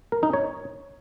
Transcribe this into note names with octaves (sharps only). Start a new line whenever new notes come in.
A#4
D#4
C#5